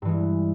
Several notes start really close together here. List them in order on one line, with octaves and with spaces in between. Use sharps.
G2 E3 G#3